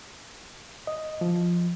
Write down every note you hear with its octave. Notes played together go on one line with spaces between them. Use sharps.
D#5
F3